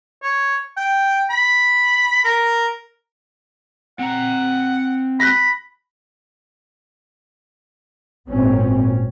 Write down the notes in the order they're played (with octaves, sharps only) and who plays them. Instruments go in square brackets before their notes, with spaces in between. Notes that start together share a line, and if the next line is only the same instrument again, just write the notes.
[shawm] C#5
G5
B5
A#4
[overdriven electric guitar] C4 A#5 [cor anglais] F#5
[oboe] B5 [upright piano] F#6 A#6
[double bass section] G#1 A#2 C4 C#4